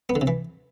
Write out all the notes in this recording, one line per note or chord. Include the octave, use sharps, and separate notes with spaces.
B3
D3
C3
E3